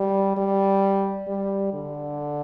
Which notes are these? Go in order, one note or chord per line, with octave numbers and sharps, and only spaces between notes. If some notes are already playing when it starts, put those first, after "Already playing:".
Already playing: G3
G3
G3
D3